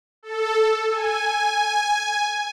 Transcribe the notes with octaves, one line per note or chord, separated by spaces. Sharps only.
A4
G#5